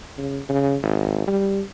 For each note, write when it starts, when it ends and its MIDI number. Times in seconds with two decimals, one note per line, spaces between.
0.18 0.40 49
0.49 0.76 49
0.83 1.23 32
1.28 1.62 55